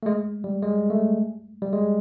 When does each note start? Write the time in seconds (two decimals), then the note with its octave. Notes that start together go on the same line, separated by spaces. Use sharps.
0.03 A3
0.06 G#3
0.44 G3
0.63 G#3
0.90 A3
1.62 G3
1.73 G#3